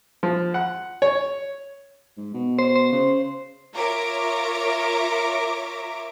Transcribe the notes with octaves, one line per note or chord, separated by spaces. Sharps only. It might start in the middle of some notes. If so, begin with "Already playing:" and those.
F3
F#5
C#5
G#2
B2
C5
C5
C#3
F4 A#4 C#5 E5 A#5 D6